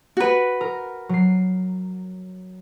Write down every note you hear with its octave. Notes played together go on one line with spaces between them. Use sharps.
F#4 B4
A#4
F#3 C7